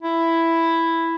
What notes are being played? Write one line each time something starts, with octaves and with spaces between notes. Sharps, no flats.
E4